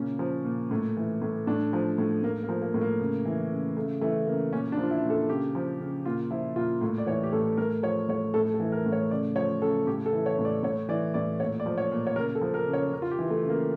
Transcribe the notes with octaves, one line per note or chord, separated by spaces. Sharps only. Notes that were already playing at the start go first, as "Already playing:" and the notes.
Already playing: A#2 C#3 C#4
F3
A#2
A2
E3
A2
A2 D4
F3
A2
A2 A#3
A#3
F3
A#3
A2
A#3
C#3
E3
C#3
C#3 A3
E3 A3
C#3 A#3
A#2 C#4
D4
F3
F4
E4
A#2
A4
C#3 G4
F3
C#3
A#2 F4
F3 E4
A#2 F4
A2
D5
E3 C#5
G4
A2 A4
A2 A#4
F3 C#5
A2 C#5
A2 A4
A4
E3
A#4
A2
C#5
C#3 D5
F3 C#5
C#3 A4
A2 G4
A4
E3
C#5
A2
D5
A2 C#5
E3 D5
A2 D5
A#2 C#5
D5
F3
C#5
A#2
C#5
C#3 A#4
A4
F3
A#4
C#3
C#5
C#3 A#4
F4
G4
E3
A3
C#3
A#3